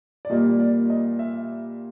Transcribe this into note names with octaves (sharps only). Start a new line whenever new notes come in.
D5
A#2 G3 A#3 D#5
D5
D#5
E5